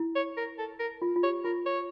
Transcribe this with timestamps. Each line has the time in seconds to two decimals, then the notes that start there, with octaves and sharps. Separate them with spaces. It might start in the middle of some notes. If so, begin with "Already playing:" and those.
Already playing: E4
0.15 C#5
0.37 A#4
0.58 A4
0.80 A#4
1.02 F4
1.16 F4
1.23 G4 C#5
1.44 F4 A#4
1.66 C#5